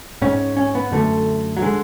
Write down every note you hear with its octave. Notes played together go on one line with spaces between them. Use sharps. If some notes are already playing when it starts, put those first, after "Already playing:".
G#2 C#4
C#4
B3
F#2 D3 A3
F#3
D3 G#3